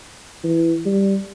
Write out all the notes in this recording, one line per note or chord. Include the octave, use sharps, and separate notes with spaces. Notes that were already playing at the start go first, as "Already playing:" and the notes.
E3
G3